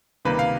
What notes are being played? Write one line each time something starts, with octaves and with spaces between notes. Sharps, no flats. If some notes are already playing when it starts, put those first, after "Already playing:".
C#2 C3 D#3 G3 A#3 B4
F5